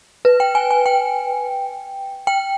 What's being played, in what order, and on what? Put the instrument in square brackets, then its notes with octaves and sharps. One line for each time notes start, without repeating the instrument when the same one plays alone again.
[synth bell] B4
G5
G#5
G#5
G5
G5